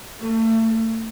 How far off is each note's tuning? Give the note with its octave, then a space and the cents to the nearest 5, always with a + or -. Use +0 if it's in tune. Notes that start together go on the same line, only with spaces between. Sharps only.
A3 +35